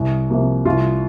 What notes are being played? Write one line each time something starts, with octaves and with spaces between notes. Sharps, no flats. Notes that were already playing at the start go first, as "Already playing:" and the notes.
Already playing: C2
C3 F3 A#3
C2 F4